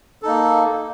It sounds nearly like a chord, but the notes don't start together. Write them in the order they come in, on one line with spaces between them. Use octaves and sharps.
A4 D#4 A#3